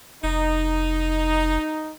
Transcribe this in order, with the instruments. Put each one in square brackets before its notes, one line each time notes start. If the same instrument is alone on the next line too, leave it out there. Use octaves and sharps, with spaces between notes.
[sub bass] F1 [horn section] D#4